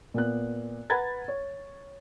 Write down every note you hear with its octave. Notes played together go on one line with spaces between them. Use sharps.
A#2 B3 F#6
B4 F#5 A#5 B5 G#6 A6
C#5